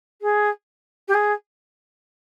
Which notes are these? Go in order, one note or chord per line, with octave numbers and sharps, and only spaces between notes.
G#4
G4
G#4